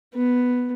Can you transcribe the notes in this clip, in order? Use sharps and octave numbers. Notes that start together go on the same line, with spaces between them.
B3